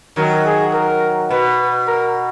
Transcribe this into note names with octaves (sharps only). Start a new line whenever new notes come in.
D#3 F#3 A#4
G#4
A#4
B2 B4
A#4